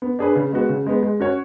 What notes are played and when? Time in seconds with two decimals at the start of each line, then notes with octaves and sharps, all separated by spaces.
0.02 B3
0.19 D4 G#4 B4
0.35 C#3
0.52 G#3 B3 F#4
0.69 C#3
0.86 G#3 B3
1.03 G#3
1.20 C#4 F#4 C#5